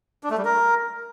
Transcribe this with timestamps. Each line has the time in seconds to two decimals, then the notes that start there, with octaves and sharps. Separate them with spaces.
0.23 D4
0.31 A3
0.38 G3
0.45 A#4